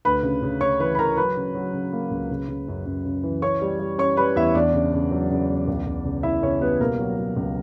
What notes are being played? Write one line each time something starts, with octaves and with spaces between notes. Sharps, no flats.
D2 B4 B5
C#3
C#3
C#3 C#5 C#6
E3 B4 B5
B5
E3 A#4 A#5
F#3 B4 B5
C#3
F#3
C#3
A#3
C#2
C#3
C#3
F#2
F#2
C#3
E3
C#4 C#5 C#6
G3
G3
C#4 C#5 C#6
G3 B4 B5
E2 E4 E5
E2 D4 D5
C#3
C#3
F#3
C#3
E2
C#2
C#2
C#3
C#3 E4 E5
C#3 C#4 C#5
G3 B3 B4
B2 A#3 A#4
F#3
F#3
C#2